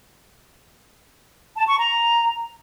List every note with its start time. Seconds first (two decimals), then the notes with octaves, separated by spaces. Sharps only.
1.56 A5
1.67 C#6
1.78 A#5